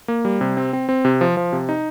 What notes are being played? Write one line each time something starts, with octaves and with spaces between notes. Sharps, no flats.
A#3
G3
C3
C4
C4
C4
C3
F3
F3
C3
D#4